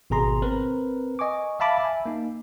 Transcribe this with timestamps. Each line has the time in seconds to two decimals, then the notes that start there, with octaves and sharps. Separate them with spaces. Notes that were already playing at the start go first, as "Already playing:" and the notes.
0.10 G#1 B2 G#4 A#5 C6
0.42 C4 A#4 B4
1.19 D#5 G#5 C#6 D6
1.60 E5 F5 A5 B5 D6
1.80 E5 G#5
2.06 A#3 D#4